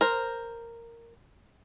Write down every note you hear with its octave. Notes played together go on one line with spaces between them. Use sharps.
A#4 C5